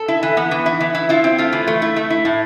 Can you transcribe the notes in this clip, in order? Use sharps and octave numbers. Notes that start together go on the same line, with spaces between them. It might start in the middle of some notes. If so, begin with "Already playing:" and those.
Already playing: A4
E4
E3
B3
E3
E4
E3
E4
E4 F4
C4
A3 F4
E3
A3
E4
A3
E4
A2